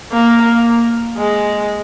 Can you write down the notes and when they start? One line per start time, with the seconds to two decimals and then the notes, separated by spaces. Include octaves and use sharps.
0.12 A#3
0.42 A#3
1.17 G#3